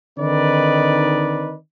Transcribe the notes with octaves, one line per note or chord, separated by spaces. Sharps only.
D3 D#3 C4 D#4 B4 D5